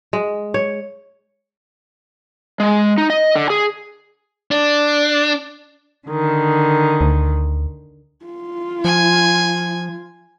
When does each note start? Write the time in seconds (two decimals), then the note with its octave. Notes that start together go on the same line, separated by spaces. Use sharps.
0.13 G#3
0.54 C#5
2.60 G#3
2.98 D#4
3.10 D#5
3.36 D3
3.50 G#4
4.51 D4
6.08 D3 D#3
7.01 D2
8.25 F4
8.85 F3 G#5